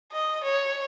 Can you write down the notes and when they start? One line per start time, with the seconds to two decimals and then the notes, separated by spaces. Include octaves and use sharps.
0.12 D#5
0.43 C#5